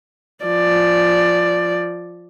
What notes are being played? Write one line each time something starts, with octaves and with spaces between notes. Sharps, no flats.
F3 D5